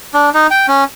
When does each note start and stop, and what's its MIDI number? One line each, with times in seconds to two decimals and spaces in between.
0.14 0.30 62
0.34 0.47 63
0.51 0.66 79
0.68 0.84 61